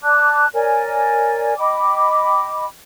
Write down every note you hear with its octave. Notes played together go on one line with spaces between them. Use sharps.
D5 A5 D6 F#6
A#4 C#5 D5 G#5
D#5 G5 B5 D6